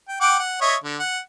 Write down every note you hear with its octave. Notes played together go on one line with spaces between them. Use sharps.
G5
F#5 G5 D6
F#5
C#5 D#5 E5
D3
F#5